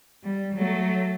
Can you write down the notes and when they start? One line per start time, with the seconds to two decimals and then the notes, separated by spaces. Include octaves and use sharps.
0.24 G3
0.55 F#3 A3